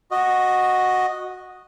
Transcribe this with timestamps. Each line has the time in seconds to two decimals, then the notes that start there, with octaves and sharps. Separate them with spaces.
0.11 F#4 D#5